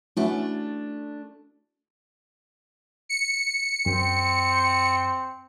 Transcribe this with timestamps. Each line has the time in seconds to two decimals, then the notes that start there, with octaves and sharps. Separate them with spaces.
0.17 A3 C#4 D4 E4 F#4
3.09 C#7
3.86 F#2 C4